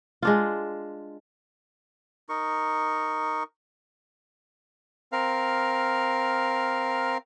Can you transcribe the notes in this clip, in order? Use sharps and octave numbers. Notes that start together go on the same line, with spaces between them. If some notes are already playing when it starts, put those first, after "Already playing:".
G#3 D4 F4
D#4 A#4 C#6
C4 A#4 F5